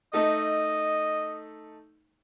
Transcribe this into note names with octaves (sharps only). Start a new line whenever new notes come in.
A3 D#4 A4 D#5